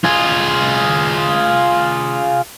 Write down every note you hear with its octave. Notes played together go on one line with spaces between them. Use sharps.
F4 G#4